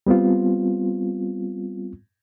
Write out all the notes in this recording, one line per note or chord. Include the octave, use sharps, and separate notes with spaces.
G3 B3 C4 F4